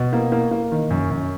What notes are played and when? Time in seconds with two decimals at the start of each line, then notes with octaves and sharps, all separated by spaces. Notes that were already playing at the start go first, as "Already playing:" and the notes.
Already playing: B2
0.13 A#3
0.32 A#3
0.51 A#3
0.72 D#3
0.90 F#2
1.10 F#2